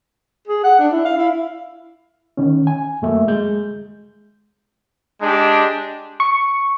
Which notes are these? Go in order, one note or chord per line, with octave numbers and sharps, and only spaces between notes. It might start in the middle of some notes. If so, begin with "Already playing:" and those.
G#4
F#5
D4
E4
F5
E4
D#3 C#4
G#5
F#2 F#3 A3 A#3 E5
G#3 G6
G#3 D4 G4
C#6